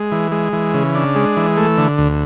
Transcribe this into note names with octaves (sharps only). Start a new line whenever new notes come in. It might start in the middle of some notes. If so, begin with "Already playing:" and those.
Already playing: G#3
E3
G#3
E3
C#3
D4
G#3
E3
A3
D3
D2